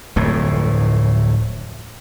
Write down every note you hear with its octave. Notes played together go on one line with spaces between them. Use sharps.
D1 F2 A2